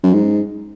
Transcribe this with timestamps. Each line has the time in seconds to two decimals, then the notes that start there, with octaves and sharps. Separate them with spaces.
0.03 F#2
0.13 G#2